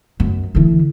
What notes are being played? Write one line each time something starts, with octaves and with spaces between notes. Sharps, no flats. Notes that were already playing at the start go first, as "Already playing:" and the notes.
F#2
D3 E3